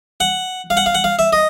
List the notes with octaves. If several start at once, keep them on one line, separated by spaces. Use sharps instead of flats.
F#5
F5
F#5
F5
F#5
F5
E5
D#5